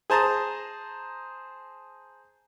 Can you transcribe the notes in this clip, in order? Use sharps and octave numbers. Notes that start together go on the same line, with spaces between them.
G#4 C5 A5 A#5 D#6